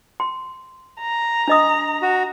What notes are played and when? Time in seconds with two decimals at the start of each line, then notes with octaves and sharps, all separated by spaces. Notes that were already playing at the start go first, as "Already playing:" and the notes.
0.20 C6
1.01 A#5
1.48 D4 D#5 D#6
2.02 F#4